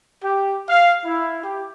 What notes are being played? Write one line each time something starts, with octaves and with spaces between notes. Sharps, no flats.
G4
F5
E4
G4